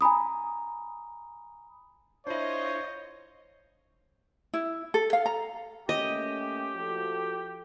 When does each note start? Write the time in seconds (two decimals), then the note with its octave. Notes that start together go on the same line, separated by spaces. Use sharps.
0.01 G#5 A#5 B5 D#6
2.27 D4 E4 F4 C5 C#5 D#5
4.54 E4
4.94 A4
5.13 F5
5.26 A#5
5.89 A3 A#3 C#4 G4 D#5
6.75 F3 F#4 A4